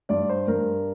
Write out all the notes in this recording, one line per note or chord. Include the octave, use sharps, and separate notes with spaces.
G2 D5
C5
G2 A#4